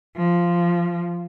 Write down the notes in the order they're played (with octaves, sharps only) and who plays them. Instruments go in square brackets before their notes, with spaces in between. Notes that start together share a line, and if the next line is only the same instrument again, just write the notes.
[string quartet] F3